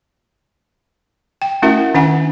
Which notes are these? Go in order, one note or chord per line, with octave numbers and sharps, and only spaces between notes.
G5
A3 C#4 E4 F#4 A#4 E5
D#3 C#4 D4 F#5 G#5